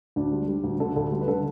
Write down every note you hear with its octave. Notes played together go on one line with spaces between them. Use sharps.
D2 D4
G3
G3
D2
D3 A4
D2 A4
G3
B4
D3 A4